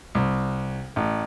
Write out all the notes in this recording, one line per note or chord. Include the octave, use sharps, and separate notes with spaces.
C2
A1